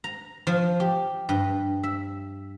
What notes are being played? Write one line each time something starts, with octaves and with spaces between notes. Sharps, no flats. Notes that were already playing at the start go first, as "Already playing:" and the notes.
A#5
F3
G4
G2
E5